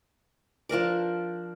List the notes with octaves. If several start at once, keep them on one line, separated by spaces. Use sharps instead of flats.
F3 D4 A#4 D5